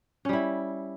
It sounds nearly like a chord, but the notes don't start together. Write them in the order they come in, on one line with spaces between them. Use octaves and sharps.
C#4 G3 E4